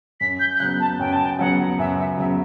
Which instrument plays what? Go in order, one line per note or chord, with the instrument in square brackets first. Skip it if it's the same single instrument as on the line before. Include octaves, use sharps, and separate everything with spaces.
[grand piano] F#2 [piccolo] B6
[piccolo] G6
G6
[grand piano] C#3 [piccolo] F#6
[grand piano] F#3 B3
[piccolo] A5
[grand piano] F#2 [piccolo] G5
[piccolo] A5
G5
[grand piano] C#3 F#3 B3 [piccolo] F#5
[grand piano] F#2 [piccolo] E5
[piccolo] E5
[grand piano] C#3 F#3 B3 [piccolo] E5